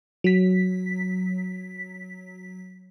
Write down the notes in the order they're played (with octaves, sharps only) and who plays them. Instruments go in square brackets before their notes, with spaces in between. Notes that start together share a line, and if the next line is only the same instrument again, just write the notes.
[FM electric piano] F#3 B6